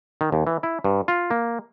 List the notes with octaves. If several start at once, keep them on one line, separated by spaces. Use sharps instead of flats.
D#3
D#2
E3
E4
G2
F4
A#3